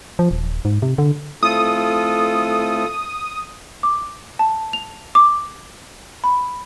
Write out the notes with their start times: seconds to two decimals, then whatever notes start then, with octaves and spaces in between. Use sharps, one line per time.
0.19 F3
0.31 D#1
0.65 G#2
0.82 C3
0.98 D3
1.43 A3 C4 E4 F4 A4 D#6
3.83 D6
4.39 A5
4.73 F7
5.15 D6
6.24 B5